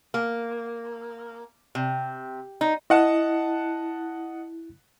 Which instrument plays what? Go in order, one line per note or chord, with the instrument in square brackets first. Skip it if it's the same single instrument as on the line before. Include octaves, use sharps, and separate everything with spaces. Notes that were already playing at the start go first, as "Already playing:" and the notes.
[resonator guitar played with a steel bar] A#3
C3
D#4
[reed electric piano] E4 [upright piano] D#5 F#5 A5